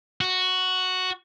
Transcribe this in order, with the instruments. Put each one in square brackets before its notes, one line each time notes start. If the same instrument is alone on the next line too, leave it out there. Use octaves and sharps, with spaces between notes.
[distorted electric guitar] F#4